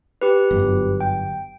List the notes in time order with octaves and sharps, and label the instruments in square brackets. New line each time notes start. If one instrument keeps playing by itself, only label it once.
[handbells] G4 B4
[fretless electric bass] G1 F#2
[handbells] G5